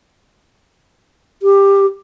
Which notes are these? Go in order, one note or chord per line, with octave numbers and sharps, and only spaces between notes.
G4